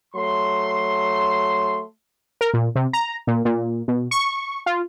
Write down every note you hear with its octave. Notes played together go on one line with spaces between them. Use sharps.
F#3 A3 C6
A#4
A#2
C3
A#5
A#2
A#2
B2
C#6
F4